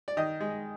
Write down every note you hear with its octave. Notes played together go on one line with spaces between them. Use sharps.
D5
D#3 D#5
G#3